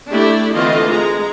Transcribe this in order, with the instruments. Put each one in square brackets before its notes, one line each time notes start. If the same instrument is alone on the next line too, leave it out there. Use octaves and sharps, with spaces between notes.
[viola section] A3 D4 E4 G4 D5
D3 E3 A3 C4 F4 D#5
G#3 A#5